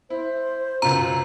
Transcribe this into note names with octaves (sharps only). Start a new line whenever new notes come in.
E4 C5
C#2 F#2 A#5